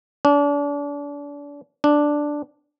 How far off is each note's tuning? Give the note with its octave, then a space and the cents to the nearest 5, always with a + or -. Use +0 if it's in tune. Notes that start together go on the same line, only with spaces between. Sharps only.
D4 -35
D4 +0